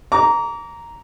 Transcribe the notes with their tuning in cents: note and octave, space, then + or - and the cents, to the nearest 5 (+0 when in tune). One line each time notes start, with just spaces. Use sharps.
A#5 +0 D6 -35